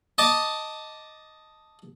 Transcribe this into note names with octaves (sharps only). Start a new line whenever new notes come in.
D#5 A5 D6